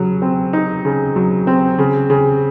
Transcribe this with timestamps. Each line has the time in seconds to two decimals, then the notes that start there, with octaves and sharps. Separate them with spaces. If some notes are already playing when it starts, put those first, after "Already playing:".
Already playing: C#3 F#3
0.22 C4
0.53 D#4
0.85 C#3
1.16 F#3
1.47 C4
1.78 C#3
2.10 C#3